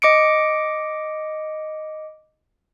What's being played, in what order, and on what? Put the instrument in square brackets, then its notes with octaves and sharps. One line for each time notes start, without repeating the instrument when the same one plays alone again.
[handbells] D#5 D6 C#7 D7